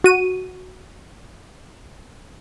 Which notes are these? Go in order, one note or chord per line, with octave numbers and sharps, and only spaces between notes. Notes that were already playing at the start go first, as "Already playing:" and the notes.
F#4 D#7